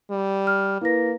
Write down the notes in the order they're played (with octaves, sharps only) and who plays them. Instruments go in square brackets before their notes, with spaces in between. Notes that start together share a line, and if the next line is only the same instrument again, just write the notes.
[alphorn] G3
[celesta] F6
[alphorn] A#3 [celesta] E4 B4 A#6